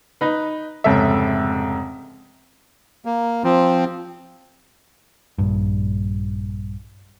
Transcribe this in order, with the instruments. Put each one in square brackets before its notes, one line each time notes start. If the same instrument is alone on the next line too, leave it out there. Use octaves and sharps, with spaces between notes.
[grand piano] D#4 B4
F1 G#2 C#3 A4 E5
[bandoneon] A#3
F3 C4
[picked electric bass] A#1 G2